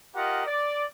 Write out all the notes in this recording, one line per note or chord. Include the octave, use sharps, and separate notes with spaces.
F4 G4 A#4 D#5 F#5
D5